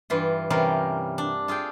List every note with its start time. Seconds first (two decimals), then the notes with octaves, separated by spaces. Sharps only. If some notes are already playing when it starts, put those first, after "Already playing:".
0.10 G2 E3 F4
0.50 C3 E3 G3 C#4 F4 A#4
1.18 D4
1.48 F4 G#4 A4 G5